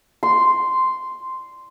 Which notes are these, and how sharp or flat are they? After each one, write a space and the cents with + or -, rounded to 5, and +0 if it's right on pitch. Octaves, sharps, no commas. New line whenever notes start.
C6 -5